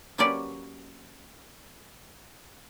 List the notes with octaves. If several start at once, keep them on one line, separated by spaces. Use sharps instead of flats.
F#3 A#3 C#4 G4 B4 D5